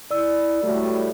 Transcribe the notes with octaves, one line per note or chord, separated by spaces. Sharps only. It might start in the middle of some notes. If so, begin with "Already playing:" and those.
E4 D5 E6
A2 G3 A3 F#4